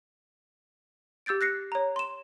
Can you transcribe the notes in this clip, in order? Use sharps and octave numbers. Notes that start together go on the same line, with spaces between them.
G4 E6 G6 A6 D7
F#6 A#6 C7 C#7
C#5 A#5
C6 E7